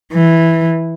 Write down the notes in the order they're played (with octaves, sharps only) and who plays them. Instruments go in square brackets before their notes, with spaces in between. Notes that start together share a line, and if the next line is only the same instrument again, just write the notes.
[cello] E3